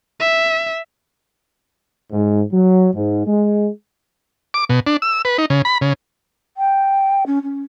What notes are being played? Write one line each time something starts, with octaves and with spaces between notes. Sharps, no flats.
E5
G#2
F#3
G#2
G#3
D6
B2
D4
E6
B4
D#4
C#3
B5
C#3
G5
C#4
C#4